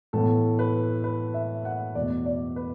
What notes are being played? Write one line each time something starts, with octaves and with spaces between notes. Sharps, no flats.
A2 E3 B3 A4
B4
B4
E5
F#5
E2 B2 A3 D5
D5
B4